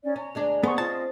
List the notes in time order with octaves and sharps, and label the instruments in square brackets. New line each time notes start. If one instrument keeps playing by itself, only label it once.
[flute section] C#4 D#4 D5
[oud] C#4 [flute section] A#5
[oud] D2 G#3 D4
[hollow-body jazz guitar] B3 [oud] C4 [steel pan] G#4 C5 C#6
[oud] C4 [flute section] F4 D#5 [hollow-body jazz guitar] A5